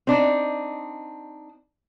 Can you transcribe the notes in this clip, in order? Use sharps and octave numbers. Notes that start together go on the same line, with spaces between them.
C4 D4 D#4